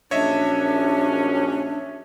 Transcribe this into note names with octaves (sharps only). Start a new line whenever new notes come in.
A#1 F#2 C#4 D4 C#5 D#5 E5